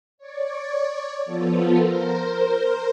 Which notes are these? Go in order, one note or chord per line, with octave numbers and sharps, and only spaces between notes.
C#5 D5
F3 B3 F4 A4
A#4 C5